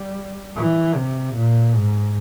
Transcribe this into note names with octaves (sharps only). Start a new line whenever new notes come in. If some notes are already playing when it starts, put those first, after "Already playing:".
Already playing: G3
E3
C3
A#2
G#2